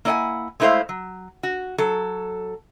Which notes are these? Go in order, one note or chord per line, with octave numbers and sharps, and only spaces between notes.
A#3 E4 D5 D#5 F#5 G#5
G#3 A3 E4 B4 C5 F5
F#3
F#4
F#3 A4